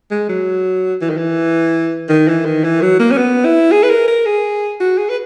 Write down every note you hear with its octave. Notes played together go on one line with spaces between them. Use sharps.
G#3
F#3
E3
D#3
E3
D#3
E3
D#3
E3
F#3
A#3
C#4
B3
E4
G#4
B4
A#4
A#4
G#4
F#4
G#4
B4